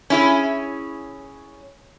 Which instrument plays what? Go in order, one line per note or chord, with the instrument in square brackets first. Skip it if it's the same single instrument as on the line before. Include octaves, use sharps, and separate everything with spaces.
[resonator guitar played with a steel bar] C#4 E4 G#4